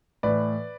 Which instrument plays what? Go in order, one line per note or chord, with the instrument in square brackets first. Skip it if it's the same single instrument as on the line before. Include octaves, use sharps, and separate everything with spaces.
[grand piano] A2 E3 B4 D5